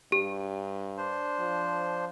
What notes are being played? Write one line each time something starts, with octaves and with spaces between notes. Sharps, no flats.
G2 G4
D4 C5
F3